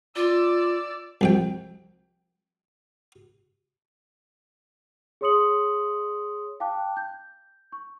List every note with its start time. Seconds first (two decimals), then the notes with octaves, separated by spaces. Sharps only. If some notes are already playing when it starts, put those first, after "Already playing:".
0.16 F4 D5 E6
1.21 C2 F2 G5
5.21 G#4 C#5 C6 D#6 C#7 F#7
6.60 F5 G5 A5 D6 F#6
6.97 G6
7.72 C#6